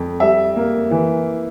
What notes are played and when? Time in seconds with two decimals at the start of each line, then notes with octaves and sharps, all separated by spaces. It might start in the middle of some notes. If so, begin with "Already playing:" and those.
Already playing: F2
0.20 G3 E5
0.56 A#3
0.91 E3